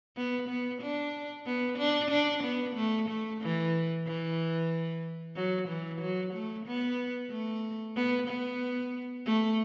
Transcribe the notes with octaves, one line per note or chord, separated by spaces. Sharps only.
B3
B3
D4
B3
D4
D4
B3
A3
A3
E3
E3
F#3
E3
F#3
A3
B3
A3
B3
B3
A3